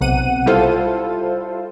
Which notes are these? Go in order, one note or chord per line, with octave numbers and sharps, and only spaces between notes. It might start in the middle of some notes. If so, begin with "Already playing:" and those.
B1 C3 F#5 D#7
G3 E4 F4 A4 C5